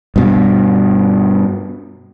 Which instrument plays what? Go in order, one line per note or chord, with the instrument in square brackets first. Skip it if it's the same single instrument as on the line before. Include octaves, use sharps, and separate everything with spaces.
[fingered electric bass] G2 B2